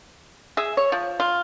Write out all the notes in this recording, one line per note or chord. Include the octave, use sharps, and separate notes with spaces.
G#4 E5
C#5
F3
F4